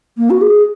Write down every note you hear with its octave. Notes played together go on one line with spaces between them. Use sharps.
A#3
F#4
G#4